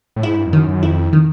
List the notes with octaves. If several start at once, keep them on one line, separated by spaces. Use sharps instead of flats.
A2
G#2 E4
G2
F2
F#2 D#3
F#2
F2 E4
D#3